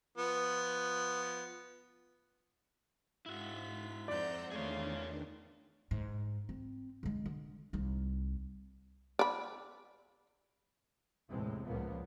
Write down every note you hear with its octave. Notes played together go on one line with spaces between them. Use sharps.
F3 B3
G#2 E4 F#4 B6
F2 C5 D5 E5 F#5 A#5 G6
E2 D#3 A3 A#3 D4 F4 G#4 C#5
G#2
C4
D3 G#3
D3
C2 D#4
D5 B5
A1 E2 A2 C3 G#3 C4
C#2 A#2 F3 A#3 B3